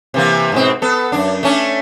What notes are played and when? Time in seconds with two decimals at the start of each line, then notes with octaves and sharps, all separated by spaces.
0.14 C3 E3 A#3
0.52 G#2 B2 C4
0.82 B3 A4
1.12 F#2 D4
1.43 A3 C#4 D4